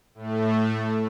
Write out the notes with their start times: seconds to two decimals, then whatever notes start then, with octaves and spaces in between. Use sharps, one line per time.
0.15 A2 A3